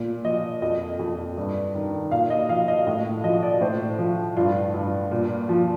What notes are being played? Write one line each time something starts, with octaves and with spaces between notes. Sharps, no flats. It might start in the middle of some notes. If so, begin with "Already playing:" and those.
Already playing: A#2
F3 D#5
F2 D#5
F2
G2
D#3
A#2 F5
D#5
F3 F5
D#5
A2 D#5
F3 D#5
D5
A2 C5
F3
G2 F4
G2
A#2
F3